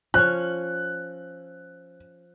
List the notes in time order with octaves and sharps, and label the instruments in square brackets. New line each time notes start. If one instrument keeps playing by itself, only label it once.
[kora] F3 C#4 [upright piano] F#6